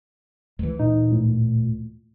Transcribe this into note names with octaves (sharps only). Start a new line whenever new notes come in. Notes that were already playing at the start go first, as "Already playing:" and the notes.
D2 E3
A#2 D#4
A2